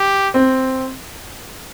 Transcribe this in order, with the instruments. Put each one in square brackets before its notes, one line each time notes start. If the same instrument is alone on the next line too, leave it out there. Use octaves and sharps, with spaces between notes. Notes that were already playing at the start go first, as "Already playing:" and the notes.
Already playing: [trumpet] G4
[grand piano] C4